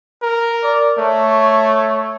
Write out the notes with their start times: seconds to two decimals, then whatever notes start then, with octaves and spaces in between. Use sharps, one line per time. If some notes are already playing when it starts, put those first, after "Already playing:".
0.23 A#4
0.63 D5
0.98 A3 C#5